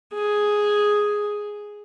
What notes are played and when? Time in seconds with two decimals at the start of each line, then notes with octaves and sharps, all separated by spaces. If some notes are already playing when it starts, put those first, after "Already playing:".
0.13 G#4